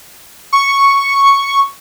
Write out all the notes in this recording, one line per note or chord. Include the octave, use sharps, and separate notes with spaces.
C#6